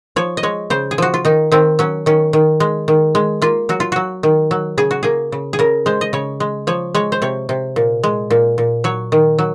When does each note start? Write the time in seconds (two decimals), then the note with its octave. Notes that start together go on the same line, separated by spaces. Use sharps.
0.16 F3 C#5
0.37 D#5
0.43 G#3 C#5
0.70 C#3 C5
0.91 G#4
0.98 F3 F#4
1.14 F4
1.25 D#3 D#4
1.52 D#3 C4
1.79 F#3 C#4
2.06 D#3 C#4
2.33 D#3
2.60 G#3
2.88 D#3
3.15 G#3
3.42 A#3 F4
3.69 F#3 F#4
3.80 F4
3.92 F#3 F#4
4.23 D#3
4.51 F#3
4.78 C#3 G#4
4.91 F#4
5.03 A#3 G#4
5.32 C#3
5.53 G#4
5.59 C#3 A#4
5.86 G#3 C5
6.01 D#5
6.13 C#3 C#5
6.40 G#3
6.67 F3 C#5
6.94 G#3 C#5
7.12 C5
7.22 C3 C#5
7.49 C3
7.76 A#2
8.03 G#3
8.30 A#2
8.58 A#2
8.84 F#3 C#5
9.12 D#3
9.39 F#3